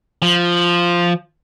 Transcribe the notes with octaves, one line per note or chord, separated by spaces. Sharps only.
F3